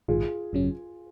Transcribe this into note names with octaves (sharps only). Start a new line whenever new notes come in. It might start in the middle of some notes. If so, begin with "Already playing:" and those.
A#1 G#2 D#3 F4 G#4
G#1 F#2 C#3 F#3 C#4